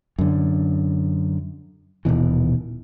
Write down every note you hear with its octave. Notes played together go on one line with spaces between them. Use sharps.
F#2 D3
D#1 C#2 B2 E3